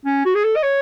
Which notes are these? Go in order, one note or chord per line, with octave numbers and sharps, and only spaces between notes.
C#4
F#4
G#4
A4
D#5
C#5